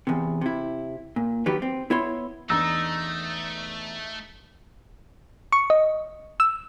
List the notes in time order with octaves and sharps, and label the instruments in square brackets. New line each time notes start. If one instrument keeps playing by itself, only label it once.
[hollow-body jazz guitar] E2 C3
C3 E4
A#2
D#3 F#3 G3 G4 B4
C4
B3 E4 C#5 C6
[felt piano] E2 D4 A#5 [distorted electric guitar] A3 [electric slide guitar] D#4 [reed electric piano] E6
[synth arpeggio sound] C#6
D#5
E6